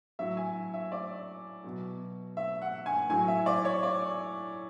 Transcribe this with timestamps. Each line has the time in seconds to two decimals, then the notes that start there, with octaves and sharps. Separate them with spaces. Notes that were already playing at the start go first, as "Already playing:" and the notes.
0.19 A2 F#3 E5
0.37 G#5
0.74 E5
0.92 D5
1.64 B2 F#3
2.37 E5
2.62 F#5
2.86 G#5
3.10 A2 F#3 G#5
3.28 E5
3.46 D5
3.65 C#5
3.83 D5